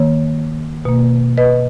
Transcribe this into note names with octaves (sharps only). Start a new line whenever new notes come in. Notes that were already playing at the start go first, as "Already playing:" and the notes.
Already playing: D#3 A#3 C#5
B2 A#3
B4 D#5